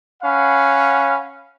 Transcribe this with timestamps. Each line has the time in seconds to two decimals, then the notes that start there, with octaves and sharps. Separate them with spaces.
0.23 C#4 F5 F#5 B5